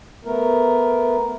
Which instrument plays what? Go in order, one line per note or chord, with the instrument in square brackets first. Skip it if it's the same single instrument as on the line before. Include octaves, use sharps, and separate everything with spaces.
[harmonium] A3 B3 A#4